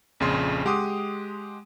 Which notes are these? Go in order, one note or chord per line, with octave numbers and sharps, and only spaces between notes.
A#1 F2 C#3 C6
G#3 G4 F#5 C6 D6 D#6